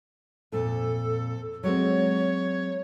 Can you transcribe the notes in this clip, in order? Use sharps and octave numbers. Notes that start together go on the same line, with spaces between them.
F2 A#2 A4
F#3 G#3 C4 C#5